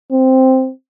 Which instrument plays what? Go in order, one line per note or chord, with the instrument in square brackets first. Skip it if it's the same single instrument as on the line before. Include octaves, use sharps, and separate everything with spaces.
[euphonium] C4